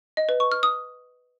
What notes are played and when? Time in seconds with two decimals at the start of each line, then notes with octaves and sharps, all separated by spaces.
0.17 D#5
0.29 B4
0.40 C#6
0.52 F6
0.63 D#6